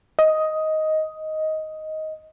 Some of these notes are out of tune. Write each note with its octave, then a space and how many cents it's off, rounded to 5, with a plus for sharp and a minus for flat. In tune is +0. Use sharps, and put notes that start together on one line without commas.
D#5 +10